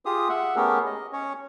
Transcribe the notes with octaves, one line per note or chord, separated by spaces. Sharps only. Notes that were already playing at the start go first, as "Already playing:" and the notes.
F4 G4 G#4 D#6
E5 F#5
A3 B3 C#4 G4 G#4 A#4
D#5
C#4 C#5